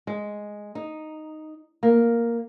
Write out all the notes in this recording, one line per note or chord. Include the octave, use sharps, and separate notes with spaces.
G#3
D#4
A#3